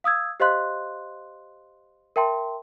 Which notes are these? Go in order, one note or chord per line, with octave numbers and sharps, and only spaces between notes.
F5 D#6 E6 G#6
G4 C5 D#5 F5 C6 F#6
A#4 E5 G5 A5 C6